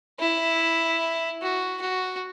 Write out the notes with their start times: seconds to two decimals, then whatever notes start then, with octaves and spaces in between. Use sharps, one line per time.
0.20 E4
1.42 F#4
1.82 F#4